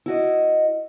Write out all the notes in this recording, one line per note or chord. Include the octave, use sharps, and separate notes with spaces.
E4 F#4 D#5